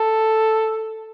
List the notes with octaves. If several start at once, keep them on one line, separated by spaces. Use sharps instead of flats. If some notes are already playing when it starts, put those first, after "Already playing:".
Already playing: A4